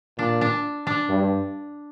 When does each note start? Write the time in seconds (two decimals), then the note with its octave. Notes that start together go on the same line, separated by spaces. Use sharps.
0.19 A#2 D4
0.41 D4
0.87 D4
1.09 G2